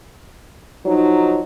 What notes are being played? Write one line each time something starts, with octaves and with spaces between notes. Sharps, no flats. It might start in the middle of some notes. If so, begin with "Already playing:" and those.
F3 F#3 D#4